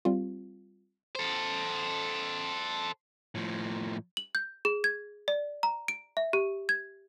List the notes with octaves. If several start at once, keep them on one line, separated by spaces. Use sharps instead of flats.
G3 C4 F4
A4 C5
A2 F3
F#7
G6
G#4
G#6
D5
A#5
D7
E5
G4
G#6